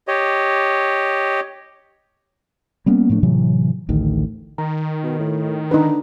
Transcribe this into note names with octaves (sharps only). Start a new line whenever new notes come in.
G4 C#5 D#5
G3 A#3 B3 C#4
A2 F3 A3 D4
A2 C3 E3 F#3
A1 D2 D#3
D#3 A#5
B2
A2
D3 D#4 B4